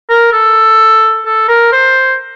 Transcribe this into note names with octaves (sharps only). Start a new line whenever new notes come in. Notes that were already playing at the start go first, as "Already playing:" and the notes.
A#4
A4
A4
A#4
C5